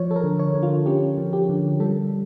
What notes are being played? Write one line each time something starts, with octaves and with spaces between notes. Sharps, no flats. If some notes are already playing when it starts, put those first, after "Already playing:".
Already playing: F3 C#5
A4
A#4
D3
C#5
D3
F4
C#4 G4
F3
G4
D3
G3 A4